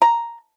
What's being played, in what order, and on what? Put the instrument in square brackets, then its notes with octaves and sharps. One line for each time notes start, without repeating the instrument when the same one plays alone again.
[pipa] A#5